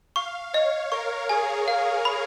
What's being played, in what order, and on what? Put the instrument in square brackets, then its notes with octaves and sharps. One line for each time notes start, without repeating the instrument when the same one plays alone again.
[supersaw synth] F5 [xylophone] C#6
[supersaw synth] C#5 [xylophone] D#5
[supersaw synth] A#4 [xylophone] C#6
[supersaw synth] G#4 [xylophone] G#5
[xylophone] F5
B5